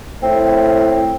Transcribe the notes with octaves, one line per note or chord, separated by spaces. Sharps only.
A2 C4